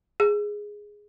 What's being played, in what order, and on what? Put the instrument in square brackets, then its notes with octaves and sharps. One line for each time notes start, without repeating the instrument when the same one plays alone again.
[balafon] G#4